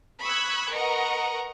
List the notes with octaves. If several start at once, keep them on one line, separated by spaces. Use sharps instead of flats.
B5 C#6 D#6 E6 F#6 G#6
A#4 B4 D#5 F#5 A#5 C#6